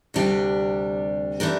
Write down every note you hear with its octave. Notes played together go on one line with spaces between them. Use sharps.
D2 C3 G3 D4 G4
E3 A3 D4 G4 A#4